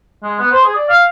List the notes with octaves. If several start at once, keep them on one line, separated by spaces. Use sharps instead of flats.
G#3
B3
C5
G#4
D5
F5